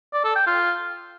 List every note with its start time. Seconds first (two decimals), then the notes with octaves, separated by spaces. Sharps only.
0.13 D5
0.24 A4
0.35 G5
0.46 F4